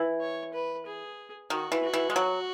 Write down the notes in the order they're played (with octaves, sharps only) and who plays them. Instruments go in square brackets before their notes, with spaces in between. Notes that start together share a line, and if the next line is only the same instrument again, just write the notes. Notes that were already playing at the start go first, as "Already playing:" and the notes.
Already playing: [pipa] E3
[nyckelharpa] C#5
B4
G#4
[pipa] D#3 [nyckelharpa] F#4
[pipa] E3
[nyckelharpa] F#4
[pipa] E3
G#3
F#3